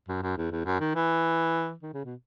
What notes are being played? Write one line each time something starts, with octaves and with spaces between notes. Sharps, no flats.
F#2
F#2
E2
E2
F#2
D#3
E3
D#3
C#3
B2